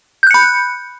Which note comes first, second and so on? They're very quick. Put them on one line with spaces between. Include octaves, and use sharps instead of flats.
G6 F#6 C#7 B5